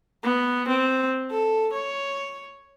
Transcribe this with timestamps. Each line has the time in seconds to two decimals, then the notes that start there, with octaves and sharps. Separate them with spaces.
0.23 B3
0.68 C4
1.31 A4
1.73 C#5